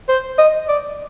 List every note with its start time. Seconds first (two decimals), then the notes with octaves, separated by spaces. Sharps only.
0.09 C5
0.38 D#5
0.68 D5